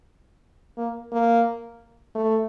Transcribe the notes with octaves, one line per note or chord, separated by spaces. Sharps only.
A#3
A#3
A3